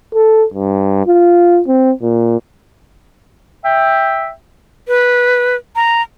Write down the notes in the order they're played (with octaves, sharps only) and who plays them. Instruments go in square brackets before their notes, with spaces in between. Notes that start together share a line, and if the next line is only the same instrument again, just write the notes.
[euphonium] A4
G2
F4
C4
A#2
[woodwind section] E5 G5
[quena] B4
A#5